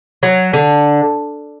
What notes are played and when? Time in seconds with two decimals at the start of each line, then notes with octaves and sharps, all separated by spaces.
0.23 F#3
0.53 D3